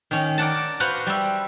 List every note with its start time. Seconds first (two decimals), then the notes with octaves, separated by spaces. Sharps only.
0.11 D#3 C#4
0.38 A#4 D5 F#5 A5
0.80 F#4 B4 C5 F5 F#5
1.07 G3 E5